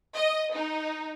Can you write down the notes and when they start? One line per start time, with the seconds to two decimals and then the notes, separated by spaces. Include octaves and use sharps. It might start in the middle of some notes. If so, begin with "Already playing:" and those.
0.15 D#5
0.54 D#4